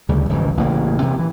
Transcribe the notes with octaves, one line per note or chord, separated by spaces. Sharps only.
D2 C#3 G3
G#1 C#2 G2 E3
A1 C#3 A#3
C3 E3
E3